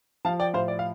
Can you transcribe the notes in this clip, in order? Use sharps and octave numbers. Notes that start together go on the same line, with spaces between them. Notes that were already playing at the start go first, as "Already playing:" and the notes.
F3 F5 A5
D5 G5
A2 C5 F5
D5
F5